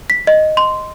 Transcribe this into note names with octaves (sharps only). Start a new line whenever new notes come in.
B6
D#5
C6